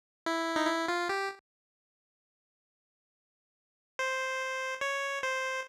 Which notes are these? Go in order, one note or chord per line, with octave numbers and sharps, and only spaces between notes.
E4
D#4
E4
F4
G4
C5
C#5
C5